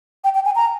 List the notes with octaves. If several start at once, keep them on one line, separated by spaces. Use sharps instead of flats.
G5
G5
G#5
A#5